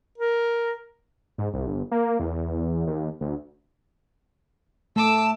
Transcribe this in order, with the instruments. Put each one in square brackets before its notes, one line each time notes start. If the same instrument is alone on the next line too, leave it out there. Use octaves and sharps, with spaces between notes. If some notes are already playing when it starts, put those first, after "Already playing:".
[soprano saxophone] A#4
[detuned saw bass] G#2
C2
G1
A#3
E2
D#2
D2
[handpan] A3 [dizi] A5 [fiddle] D6 E6